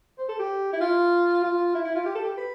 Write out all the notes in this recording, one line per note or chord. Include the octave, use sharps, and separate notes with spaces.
C5
A4
G4
E4
F4
F4
E4
E4
F4
G4
A4
G4
B4